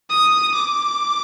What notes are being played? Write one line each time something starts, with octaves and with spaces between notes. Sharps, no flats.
D#6
D6